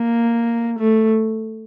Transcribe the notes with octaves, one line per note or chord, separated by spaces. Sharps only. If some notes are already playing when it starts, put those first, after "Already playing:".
Already playing: A#3
A3